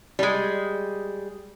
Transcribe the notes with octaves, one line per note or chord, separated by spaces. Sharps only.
G3 G#3